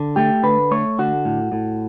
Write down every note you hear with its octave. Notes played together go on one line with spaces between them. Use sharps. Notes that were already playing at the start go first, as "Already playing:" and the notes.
Already playing: D3
A3 G4
D3 B4
A3 C#5
D3 F#4
A2
A2